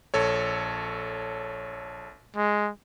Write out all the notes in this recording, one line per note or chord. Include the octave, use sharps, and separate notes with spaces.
A#1 A4 C#5
G#3